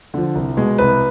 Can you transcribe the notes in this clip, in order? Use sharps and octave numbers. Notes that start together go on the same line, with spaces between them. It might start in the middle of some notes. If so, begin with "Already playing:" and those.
D3 F3
C2
B2 G#3
C2 B4